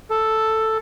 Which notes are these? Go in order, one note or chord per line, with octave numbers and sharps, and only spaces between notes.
A4